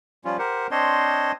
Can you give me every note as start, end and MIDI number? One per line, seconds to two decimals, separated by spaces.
0.25 0.37 53
0.25 0.37 55
0.25 0.37 61
0.25 0.37 65
0.39 0.67 67
0.39 0.67 70
0.39 0.67 72
0.39 0.67 78
0.71 1.32 60
0.71 1.32 62
0.71 1.32 72
0.71 1.32 73
0.71 1.32 75
0.71 1.32 84